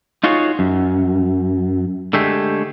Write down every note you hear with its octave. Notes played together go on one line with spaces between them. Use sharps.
D#4 F4 F#4 G#4 C#5
F#2
D3 G#3 A3 G4 G#4